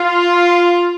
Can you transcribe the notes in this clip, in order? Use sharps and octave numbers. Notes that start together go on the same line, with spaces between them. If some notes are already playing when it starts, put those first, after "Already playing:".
Already playing: F4